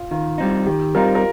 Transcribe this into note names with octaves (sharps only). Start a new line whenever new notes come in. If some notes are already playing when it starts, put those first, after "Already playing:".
Already playing: F4
D#3 F4
G3 C4 D#4
D#3 G4
G3 C4 D#4 F4 A#4
A#4